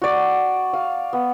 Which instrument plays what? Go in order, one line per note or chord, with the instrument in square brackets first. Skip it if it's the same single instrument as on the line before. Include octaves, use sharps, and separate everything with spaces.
[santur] F#4 D5
F5
B3